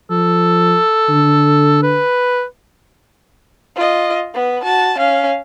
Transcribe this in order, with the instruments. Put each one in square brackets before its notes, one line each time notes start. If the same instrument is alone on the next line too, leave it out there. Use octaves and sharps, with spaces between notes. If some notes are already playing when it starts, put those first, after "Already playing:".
[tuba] F3 [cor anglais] A4
[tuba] D3
[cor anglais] B4
[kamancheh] F4 D#5
B3 B4
F#4 A5
C#4 F5